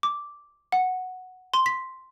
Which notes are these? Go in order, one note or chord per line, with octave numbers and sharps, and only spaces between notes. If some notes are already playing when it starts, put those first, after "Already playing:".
D6
F#5
C6
B6